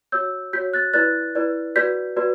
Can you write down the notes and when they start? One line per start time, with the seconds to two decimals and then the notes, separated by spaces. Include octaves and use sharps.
0.12 F#4 C#5 E6 G6
0.53 F#4 C#5 G6 B6
0.73 F#6 A6
0.94 E4 B4 D5 F#6 A6
1.35 E4 B4 D5
1.76 F#4 B4 D5 G6 B6
2.17 F#4 B4 D5